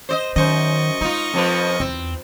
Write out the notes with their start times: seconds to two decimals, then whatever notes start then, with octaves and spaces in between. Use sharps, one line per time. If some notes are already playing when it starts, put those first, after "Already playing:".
0.09 C5 D5 D#5
0.36 F#2 D#3 C5 D#5 C#6
1.01 G#3 D#4 F4
1.34 F2 F3 B4
1.80 E2 C4